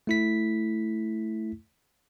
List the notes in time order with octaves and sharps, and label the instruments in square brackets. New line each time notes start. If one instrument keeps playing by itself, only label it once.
[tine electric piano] A3 E4 B6